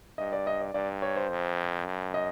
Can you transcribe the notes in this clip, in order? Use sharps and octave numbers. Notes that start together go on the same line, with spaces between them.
G2 D#5
D5
D#5
D5
G2 D5
C#5
C5
F2
F#2
D#5